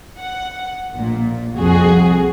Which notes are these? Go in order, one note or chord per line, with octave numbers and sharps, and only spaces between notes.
F#5
A#1 A#2
C2 F2 F#4 G#4